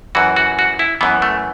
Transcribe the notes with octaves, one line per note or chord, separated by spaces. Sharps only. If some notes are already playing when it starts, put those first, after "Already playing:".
F#2 E3 F#4
F#4
F#4
E4
F#2 E3 B3
A3